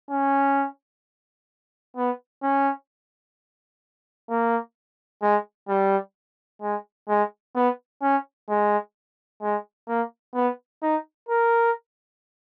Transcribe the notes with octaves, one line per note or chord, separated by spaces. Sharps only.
C#4
B3
C#4
A#3
G#3
G3
G#3
G#3
B3
C#4
G#3
G#3
A#3
B3
D#4
A#4